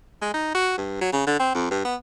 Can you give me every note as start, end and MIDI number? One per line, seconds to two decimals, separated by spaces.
0.22 0.33 56
0.34 0.51 63
0.55 0.74 66
0.78 0.99 43
1.01 1.12 54
1.13 1.25 49
1.27 1.39 50
1.40 1.51 60
1.55 1.67 41
1.71 1.84 43
1.85 1.96 59